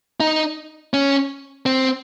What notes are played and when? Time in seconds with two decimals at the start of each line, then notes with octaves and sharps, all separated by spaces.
0.20 D#4
0.94 C#4
1.66 C4